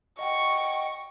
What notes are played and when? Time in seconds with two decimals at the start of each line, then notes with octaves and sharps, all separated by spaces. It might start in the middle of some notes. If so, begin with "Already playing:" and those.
0.19 D#5 F#5 G5 C#6